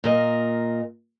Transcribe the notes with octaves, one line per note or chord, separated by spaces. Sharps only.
A#2 A#4 D#5